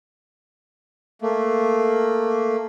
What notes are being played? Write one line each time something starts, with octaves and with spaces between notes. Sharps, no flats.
A3 A#3